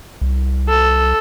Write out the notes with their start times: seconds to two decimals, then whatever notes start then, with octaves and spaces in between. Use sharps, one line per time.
0.21 C2
0.69 A4